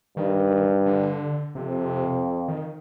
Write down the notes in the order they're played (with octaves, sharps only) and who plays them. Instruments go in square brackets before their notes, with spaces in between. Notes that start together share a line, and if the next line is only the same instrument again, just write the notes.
[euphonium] G2 [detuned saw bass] D#3
[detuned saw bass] D3
[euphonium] F2 [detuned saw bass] C3
[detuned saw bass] D#3